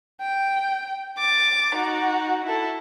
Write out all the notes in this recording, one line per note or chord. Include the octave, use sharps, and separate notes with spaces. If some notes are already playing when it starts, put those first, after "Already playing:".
G5
D6 A6
D#4 F#4
E4 A4